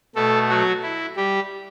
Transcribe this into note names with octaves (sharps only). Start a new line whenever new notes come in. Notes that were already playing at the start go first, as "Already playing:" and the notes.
B2 A3 A4
F#3 F#4
E4
G3 G4